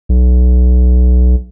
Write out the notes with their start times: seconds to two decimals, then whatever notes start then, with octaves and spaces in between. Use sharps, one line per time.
0.09 B1